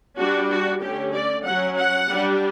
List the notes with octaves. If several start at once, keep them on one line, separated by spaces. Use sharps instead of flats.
G3 D4 F#4
F#4
D3 A3 C#4 G4
D5
F#3 C#4 F#5
F#5
G3 D4